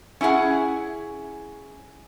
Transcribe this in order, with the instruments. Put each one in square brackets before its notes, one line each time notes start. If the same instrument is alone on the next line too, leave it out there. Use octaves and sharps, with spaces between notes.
[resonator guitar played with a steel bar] C#4 E4 G4 G#4 F#5